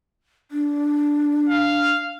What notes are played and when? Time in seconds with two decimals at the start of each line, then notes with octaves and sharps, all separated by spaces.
0.51 D4
1.49 F5